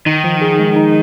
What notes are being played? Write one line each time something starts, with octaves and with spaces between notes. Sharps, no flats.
D#3 D#4
F3
G#4
G#3
D#4